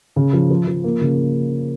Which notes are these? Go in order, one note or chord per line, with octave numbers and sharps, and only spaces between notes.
C#3
F3
F3
F3
A#3
C#3